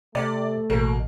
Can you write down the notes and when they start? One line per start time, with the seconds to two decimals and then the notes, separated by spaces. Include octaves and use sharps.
0.15 C3 A3 D5
0.70 A1 B2 A#3